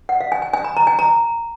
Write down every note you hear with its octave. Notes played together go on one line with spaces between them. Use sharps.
F#5
F5
G#5
G#5
G#5
B5
A#5
G#5
A#5